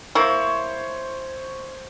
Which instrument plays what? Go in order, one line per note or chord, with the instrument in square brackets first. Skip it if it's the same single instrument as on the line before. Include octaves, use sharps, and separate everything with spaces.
[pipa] A#3 E4 [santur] C5 C#5